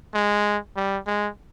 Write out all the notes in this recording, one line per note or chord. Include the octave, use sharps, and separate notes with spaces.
G#3
G3
G#3